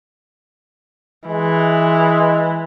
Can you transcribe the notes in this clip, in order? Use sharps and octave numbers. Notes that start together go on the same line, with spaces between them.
E3 G#3